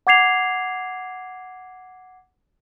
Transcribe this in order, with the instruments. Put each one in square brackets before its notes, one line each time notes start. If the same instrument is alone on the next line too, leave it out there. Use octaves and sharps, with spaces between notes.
[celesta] F#5 D6 G#6 C7 F7